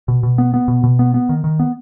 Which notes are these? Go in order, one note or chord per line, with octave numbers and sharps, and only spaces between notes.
B2
B2
B3
B3
B2
B2
B3
B3
D#3
D#3
B3